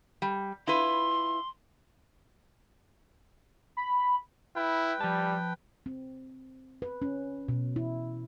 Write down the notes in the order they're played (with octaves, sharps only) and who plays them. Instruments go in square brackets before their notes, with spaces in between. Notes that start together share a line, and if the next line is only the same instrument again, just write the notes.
[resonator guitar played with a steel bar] G3
[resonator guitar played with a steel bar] E4 F4 B4 [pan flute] C6
[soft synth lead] B5
[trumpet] E4 [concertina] B4 G5
[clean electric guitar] F3 A5 [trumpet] G3
[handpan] C4
B4
C#4
B2
E4